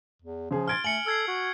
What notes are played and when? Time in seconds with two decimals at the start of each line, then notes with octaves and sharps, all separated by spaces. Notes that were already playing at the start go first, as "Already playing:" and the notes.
0.22 E2
0.51 C#3 F3 G#4
0.68 C6 F6 G#6 A6 D7
0.84 A3 G#5 C#7 F#7
1.06 A4 E6 G#6 C7
1.28 F#4